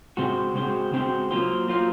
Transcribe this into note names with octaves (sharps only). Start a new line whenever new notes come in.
C#3 G#3 C4 F#4 C5
C#3 G#3 C4 F#4 C5
C#3 G#3 C4 F#4 C5
F#3 A#3 F4 C5
F#3 A#3 F4 C5